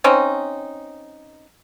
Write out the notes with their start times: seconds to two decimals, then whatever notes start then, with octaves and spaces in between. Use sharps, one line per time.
0.04 C4 C#4 D#4